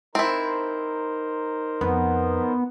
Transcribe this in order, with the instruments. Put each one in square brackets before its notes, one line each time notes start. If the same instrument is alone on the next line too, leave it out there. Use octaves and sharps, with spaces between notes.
[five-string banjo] C4 E4 [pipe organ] D#4 A#4 C5
[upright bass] F2 [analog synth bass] B3